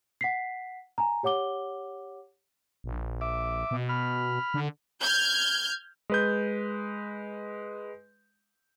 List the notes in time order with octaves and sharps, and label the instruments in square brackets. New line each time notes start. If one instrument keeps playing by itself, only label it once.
[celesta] F#5 B6 C7
G#5 A#5
G4 C#5 F#5 D6 G7
[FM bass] A#1
[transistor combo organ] E5 D6
[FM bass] B2
[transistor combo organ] B5 F6
[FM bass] D3
[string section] F6 G6 G#6
[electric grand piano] G#3 B4 G6